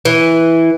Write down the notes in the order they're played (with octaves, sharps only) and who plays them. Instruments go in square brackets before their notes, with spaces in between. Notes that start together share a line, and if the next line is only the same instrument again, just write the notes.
[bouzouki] E3